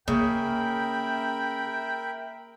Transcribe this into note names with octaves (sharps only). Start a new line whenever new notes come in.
C#3 A#3 A#4 E5 G5 B5